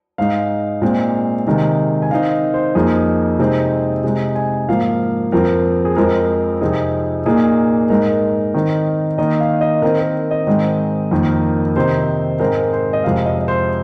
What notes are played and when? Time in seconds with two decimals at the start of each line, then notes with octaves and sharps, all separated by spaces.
0.18 G#2 G#3 D#4 F5
0.82 A#2 G#3 C4
1.46 C3 D#3 G#3 D#4
2.02 G#5
2.11 D#3 C4 D#4 F5
2.54 C5
2.75 F2 F3 A#3 D#4 G#4
3.39 C3 G#3 C4 D#4
4.04 C3 G#3 D#4 G#4
4.35 G#5
4.68 G#2 F3 A#3 F5
5.32 F2 F3 C4 A#4
5.85 G#4
5.96 F2 F3 G#3 C4 A#4
6.61 F2 C3 F3 C4 D#4 G#4
7.26 A#2 A#3 D#4 G#4
7.90 G#2 G#3 D#4 A#4
8.54 D#3 C4 D#4
9.18 D#3 A#3 D#4 D#5
9.40 F5
9.61 D#5
9.82 D#3 C4 D#4 A#4
10.00 A#4
10.31 D#5
10.47 G#2 D#3 G#3 C4
11.11 F2 D#3 A#3 D#4
11.76 C3 D#3 C4 D#4 C5
12.40 G#2 G#3 C4 A#4
12.73 C5
12.93 D#5
13.04 F2 C3 G#3 F5
13.25 D#5
13.39 D#5
13.48 C5